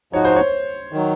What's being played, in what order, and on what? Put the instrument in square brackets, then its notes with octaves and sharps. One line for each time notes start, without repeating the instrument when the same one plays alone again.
[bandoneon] G#2 F3 G#3 D#4 F#4 [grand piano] C#5
[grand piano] C5
C#5
[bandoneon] D#3 F#3